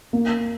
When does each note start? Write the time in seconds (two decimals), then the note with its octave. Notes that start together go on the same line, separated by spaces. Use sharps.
0.13 A#3